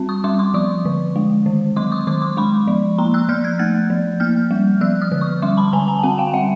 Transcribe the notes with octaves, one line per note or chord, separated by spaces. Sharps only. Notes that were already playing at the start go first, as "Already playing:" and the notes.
Already playing: G3 C4
C#6 D#6
G3 C6 D6
C6 D6
F3 C#6 D#6
D3
G#3
D#3
F#3 C6 D6
C#6 D#6
D#3 C6 D6
C6 D6
G#3 B5 C#6
F3
A#3 A#5 C6
E6 F#6
F3 F6 G6
F#6 G#6
A3 G6 A6
F3
A#3 F6 G6
G3
F3 E6 F#6
D#6 F6
D3
C#6 D#6
G3 C6 D6
A5 B5
D3 G#5 A#5
G#5 A#5
A5
C4 F#5 G#5
F5 G5
G3 E5 F#5